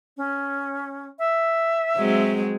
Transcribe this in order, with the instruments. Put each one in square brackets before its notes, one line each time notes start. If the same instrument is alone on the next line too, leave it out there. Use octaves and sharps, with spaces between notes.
[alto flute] C#4
E5
[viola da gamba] F#3 G#3 C4